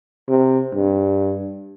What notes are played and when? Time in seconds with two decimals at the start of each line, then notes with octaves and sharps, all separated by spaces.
0.29 C3
0.74 G2